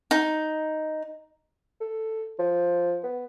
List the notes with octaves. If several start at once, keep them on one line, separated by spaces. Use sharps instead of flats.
D#4
A4
F3
B3